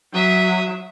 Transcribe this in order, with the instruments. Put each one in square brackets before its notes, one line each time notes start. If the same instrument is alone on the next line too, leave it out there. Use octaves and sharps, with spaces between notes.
[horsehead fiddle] F#3 [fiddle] E5 D#6